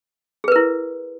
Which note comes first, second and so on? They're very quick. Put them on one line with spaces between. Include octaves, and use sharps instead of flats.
G#4 B4 A#4 E4